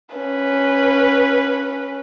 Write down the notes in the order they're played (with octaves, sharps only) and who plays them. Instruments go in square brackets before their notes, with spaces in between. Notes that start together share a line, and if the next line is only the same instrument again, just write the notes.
[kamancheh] C#4 B4